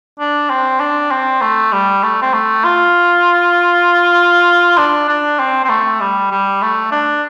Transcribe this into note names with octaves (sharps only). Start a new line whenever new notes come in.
D4
C4
D4
C4
A3
G3
A3
C4
A3
F4
D4
D4
C4
C4
A3
G3
G3
A3
D4